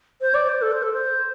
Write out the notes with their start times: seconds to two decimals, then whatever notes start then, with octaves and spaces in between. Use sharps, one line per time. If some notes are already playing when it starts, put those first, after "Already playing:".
0.21 C5
0.34 D5
0.49 C5
0.62 A4
0.72 C5
0.83 A4
0.93 C5